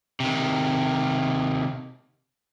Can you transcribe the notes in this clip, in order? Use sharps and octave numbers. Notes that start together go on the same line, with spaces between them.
C3 D#3